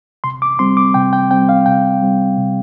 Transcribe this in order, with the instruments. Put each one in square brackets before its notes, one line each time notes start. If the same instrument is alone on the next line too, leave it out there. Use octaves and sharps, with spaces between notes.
[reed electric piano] C3 C6
D6
G3 C4 C6
D6
C3 G5
G5
G3 C4 G5
F5
C3 G5
G3 C4
C3